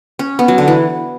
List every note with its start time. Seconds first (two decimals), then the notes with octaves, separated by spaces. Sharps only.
0.19 C#4
0.39 B3
0.48 F#3
0.58 D3
0.68 E3